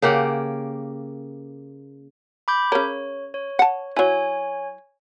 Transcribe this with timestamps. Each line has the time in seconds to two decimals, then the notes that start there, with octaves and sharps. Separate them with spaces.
0.02 C#3 A#3 G4 F#5
2.48 B5 D6 G6
2.72 C#3 A#4 C#5
3.34 C#5
3.59 F#5 A5
3.96 F#3 E4 C#5 G#5